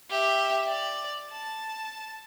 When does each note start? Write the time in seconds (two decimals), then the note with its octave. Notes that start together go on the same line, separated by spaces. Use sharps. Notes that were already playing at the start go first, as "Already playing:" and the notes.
0.10 G4 E5
0.68 D5
1.31 A5